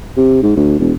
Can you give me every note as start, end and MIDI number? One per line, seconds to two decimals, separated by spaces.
0.17 0.41 48
0.43 0.53 44
0.56 0.79 38
0.79 0.92 28